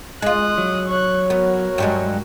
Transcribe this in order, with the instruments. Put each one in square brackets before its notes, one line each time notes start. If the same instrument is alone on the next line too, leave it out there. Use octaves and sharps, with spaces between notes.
[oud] G#3 F4 [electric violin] D#6 F#6
[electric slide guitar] F#3
[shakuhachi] C#5 [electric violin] C#6 F#6
[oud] B3 [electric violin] F#4 A#4
[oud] G2 F#3 G#3